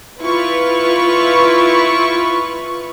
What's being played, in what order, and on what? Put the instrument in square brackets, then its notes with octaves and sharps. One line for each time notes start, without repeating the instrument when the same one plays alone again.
[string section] E4 F4 B4 C#6